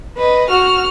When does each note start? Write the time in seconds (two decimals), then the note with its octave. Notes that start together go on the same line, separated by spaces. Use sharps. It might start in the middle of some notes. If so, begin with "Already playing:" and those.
0.17 B4 D#5
0.50 F#4 F6